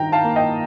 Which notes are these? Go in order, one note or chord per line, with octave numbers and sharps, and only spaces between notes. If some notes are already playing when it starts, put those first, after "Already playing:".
Already playing: G2 D#3 G5 A#5
F5 A5
A#3
D#5 G5